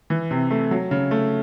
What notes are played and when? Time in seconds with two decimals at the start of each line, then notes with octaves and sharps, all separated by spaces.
0.10 E3
0.31 C3
0.51 A3
0.71 F#3
0.91 C#3
1.11 A3